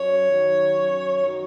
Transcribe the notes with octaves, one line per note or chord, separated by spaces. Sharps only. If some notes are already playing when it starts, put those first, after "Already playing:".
Already playing: F#2 C#5
D#3 F#3
F#2
D#3 F#3